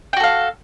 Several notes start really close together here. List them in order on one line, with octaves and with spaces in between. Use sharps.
G5 F#4 A4 F5